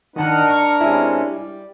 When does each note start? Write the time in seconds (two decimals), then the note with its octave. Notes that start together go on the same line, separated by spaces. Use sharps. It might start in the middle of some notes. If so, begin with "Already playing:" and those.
0.16 D#3 D4 A#4 D#5 F#5 A5 F#6
0.50 C#6 F6
0.81 C3 G#3 C#4 E4
1.26 G3